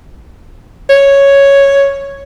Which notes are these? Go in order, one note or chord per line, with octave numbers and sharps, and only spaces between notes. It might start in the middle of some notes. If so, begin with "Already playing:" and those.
C#5